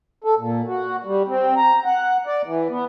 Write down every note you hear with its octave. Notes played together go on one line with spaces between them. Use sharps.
A4
A#2
F#4
G3
C4
A#5
F#5
D5
E3
B3